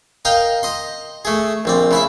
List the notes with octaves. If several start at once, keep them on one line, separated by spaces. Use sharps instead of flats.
A#4 D#5 F5 G5
D#5 C6
A3 G#4
A#1 C4 D5
C#3 E4 E5